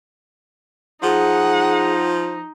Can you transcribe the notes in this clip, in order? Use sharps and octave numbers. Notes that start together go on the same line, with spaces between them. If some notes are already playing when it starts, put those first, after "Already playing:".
F3 D#4 G#4 F#5